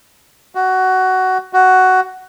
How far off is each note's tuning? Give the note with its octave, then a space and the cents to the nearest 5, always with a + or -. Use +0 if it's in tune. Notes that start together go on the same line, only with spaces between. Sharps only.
F#4 +15
F#4 +10